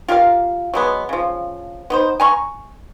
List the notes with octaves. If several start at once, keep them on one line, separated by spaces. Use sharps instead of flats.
F4 G4 A#4 F5
F#3 G#3 B3
C#3 F3
B3 D#4 C5
G#5 A#5 C6 C#6